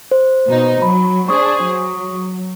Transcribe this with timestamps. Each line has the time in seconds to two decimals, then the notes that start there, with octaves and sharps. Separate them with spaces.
0.11 C5
0.49 B2 D#4
0.82 F#3 B5
1.29 D4 G#4 C5 C#6 D#6
1.63 F#3